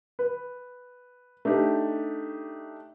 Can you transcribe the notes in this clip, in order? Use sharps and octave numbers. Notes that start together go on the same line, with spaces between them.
B4
A3 D4 D#4 G4